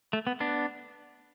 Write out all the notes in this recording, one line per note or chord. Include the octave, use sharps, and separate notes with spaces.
A3
B3
B3 D4